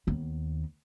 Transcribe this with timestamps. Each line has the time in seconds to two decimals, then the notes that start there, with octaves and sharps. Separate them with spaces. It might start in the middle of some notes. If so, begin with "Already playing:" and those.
0.07 D#2 B3